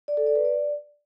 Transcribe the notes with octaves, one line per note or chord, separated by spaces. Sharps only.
D5
A4
D5
B4
D5